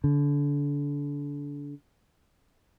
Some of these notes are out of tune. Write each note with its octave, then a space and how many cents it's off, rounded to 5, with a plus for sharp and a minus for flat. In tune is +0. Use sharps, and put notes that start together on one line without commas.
D3 -30